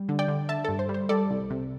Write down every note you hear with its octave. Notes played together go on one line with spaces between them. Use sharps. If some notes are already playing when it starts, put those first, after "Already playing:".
Already playing: G3
D3
D5 G5
D3
D3 E5 A5
A4
G2
C5
G3
C5
G3 A4 D5
C2
C3